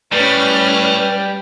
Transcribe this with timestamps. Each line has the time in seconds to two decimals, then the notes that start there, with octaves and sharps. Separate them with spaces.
0.13 A2 G3 C#4 B4 F6